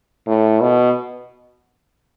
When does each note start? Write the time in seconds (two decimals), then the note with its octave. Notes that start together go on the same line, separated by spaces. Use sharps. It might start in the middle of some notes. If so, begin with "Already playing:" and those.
0.27 A2
0.61 B2